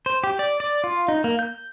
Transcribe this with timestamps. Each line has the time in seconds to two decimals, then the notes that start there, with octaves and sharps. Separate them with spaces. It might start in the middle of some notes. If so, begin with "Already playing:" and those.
0.06 C5
0.24 G4
0.39 D5
0.60 D5
0.84 F4
1.08 D#4
1.24 A#3
1.39 G6